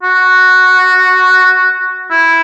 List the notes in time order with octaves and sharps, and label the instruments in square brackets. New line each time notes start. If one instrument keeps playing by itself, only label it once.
[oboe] F#4
E4